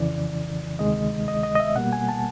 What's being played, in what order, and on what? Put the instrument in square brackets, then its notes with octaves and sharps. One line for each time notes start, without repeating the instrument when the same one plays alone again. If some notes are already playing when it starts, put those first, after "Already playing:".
Already playing: [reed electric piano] F2 C#3 E3 D5
D2 C3 D#3 G#3 D#5
D#5
D#5
D#5
E5
B2 G3 A#3 F#5
G#5
A5